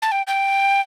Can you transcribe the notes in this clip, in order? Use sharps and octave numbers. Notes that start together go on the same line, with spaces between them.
A5
G5
G5